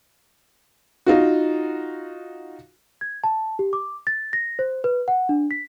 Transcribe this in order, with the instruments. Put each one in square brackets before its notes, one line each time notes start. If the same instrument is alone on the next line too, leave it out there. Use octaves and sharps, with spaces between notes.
[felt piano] D#4 F4 F#4
[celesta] G#6
A5
G4
D6
A6
A#6
C5
B4
F#5
D4
B6